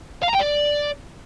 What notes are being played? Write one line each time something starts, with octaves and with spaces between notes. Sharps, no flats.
F5
A#5
G5
D5